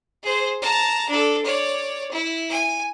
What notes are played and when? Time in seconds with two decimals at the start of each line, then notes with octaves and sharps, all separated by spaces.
0.23 G#4 C5
0.62 A5 A#5
1.09 D4 A4
1.45 C#5 D5
2.11 E4
2.51 G#5